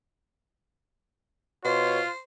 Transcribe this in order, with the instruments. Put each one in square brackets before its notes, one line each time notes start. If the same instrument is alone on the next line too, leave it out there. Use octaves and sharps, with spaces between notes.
[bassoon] B2 [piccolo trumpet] F4 [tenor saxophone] C5 [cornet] C#5